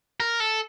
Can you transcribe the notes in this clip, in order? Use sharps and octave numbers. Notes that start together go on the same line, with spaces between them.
A#4
A4